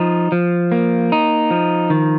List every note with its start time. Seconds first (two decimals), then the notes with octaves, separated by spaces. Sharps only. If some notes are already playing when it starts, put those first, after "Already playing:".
Already playing: F3 D#4
0.32 F3
0.72 A#3
1.12 D#4
1.51 F3
1.90 D#3